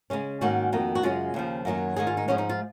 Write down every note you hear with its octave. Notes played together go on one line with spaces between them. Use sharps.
C#3 G#3 C#4
G#2 D#3 A#3 C#4 F#4
F2 D#3 A#3
F#4
F#2 C#3 G#3 C#4 F4
D#2 C#3 F3
F#2 D#3 F#3 A#3
G#2 D#3 G#3 G#4
F4
D#4
G#2 F3 G#3 C#4
D#4
F4